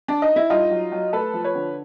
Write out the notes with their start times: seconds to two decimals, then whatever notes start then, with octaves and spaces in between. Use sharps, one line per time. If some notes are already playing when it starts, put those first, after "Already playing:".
0.08 D4
0.22 D#4
0.36 E4
0.50 G2 D#4 F4
0.71 F#3
0.92 F#3
1.13 A3 A4 B4
1.34 F3
1.44 B4 C#5
1.55 D3